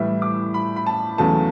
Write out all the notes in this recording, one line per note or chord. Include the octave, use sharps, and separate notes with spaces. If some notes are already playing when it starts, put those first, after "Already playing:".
Already playing: A2 E3 G3 E5
D6
B5
B5
A5
E2 C#3 F#3 A3 A5